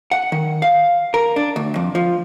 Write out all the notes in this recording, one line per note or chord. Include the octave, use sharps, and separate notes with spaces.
F#5
D#3
F5
A#4
D4
D2
F2
F3